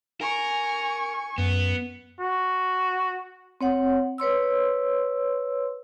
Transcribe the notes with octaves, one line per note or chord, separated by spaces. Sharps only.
A#4 G#5 C#6
F#2 B3
F#4
C4 C#5 F#5
B4 C#5 C6 E6